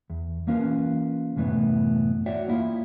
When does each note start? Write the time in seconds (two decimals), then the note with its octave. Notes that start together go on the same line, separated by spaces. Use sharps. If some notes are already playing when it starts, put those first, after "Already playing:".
0.10 E2
0.47 E3 A#3 C#4 F4 A#4 B4
1.36 C2 F#2 A2 E3 A3 B3
2.26 F#4 C#5 D5 E5 F#5 G5
2.48 A#3 E4 F4